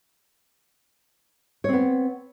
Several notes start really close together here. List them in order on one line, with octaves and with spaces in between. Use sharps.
C#5 C4 B3